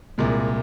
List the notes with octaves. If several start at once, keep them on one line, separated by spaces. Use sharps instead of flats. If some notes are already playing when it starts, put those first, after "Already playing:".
C2 A#2 G#3